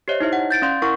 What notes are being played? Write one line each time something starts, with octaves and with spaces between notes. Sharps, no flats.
G4 C5 C#5 D#5 E5
D#4 E4 C5 E5
F#5
G6 A6 D7
C#4 D5 F5 C6 G6
E4 A#4 F#5 C#6